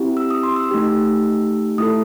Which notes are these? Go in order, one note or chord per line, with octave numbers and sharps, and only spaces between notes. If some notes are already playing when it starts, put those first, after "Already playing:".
Already playing: C4 E4 G4
E6
D#6
C6
E6
A3 D#4 G4
A3 E4 A4 D#6